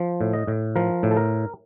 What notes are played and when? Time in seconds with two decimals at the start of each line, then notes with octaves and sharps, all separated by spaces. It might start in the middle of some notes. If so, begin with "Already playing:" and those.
Already playing: F3
0.21 A2
0.33 D#5
0.47 A2
0.75 F3 A#4
1.03 A2
1.11 A4
1.17 A#4